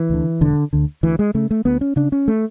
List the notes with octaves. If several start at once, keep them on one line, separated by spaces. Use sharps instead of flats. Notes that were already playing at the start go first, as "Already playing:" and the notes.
Already playing: E3
D2 D3
E1 D3
D2 D3
D2 E3
G#3
C#3 A3
A3
D2 B3
C#4
C#3 D4
C#4
A3